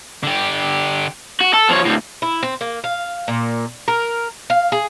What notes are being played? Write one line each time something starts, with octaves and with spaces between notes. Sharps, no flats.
D3 G4
F#4
A4
F3 C#5
D2 A2
E4
C4
A#3
F5
A#2
A#4
F5
G#4